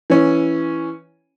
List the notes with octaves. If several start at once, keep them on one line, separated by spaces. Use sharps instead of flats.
E3 C#4